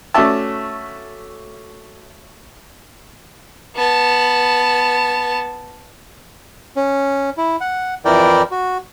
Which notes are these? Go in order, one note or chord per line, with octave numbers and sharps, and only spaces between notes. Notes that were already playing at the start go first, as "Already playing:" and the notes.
A3 C#4 F#4 D5 E5 A5
B3 A5
C#4
E4
F#5
F2 E3 E4 A#4 D5 G5
F#4